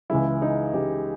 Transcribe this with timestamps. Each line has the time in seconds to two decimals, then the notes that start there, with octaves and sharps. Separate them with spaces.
0.10 C#2 C#3 E3 G#3 E4
0.42 D#4
0.73 C#2 C#3 E3 G#3 G4